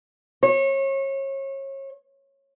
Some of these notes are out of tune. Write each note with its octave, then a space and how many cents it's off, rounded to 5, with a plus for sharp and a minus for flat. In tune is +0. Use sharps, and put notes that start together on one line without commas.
C#5 -30